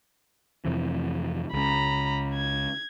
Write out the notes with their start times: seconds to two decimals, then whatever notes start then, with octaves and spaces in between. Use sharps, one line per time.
0.65 F2 C3 E3
1.53 C#2 C#3 A#5 B5
2.35 G#6